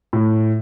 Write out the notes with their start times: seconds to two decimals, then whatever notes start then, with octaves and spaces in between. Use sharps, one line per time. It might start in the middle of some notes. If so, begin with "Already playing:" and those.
0.13 A2